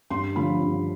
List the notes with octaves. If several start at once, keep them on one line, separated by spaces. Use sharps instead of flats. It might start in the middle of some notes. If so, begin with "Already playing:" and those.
G2 C6
D3 F3 A3 B5
G2